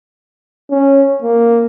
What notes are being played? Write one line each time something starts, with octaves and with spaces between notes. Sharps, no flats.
C#4
A#3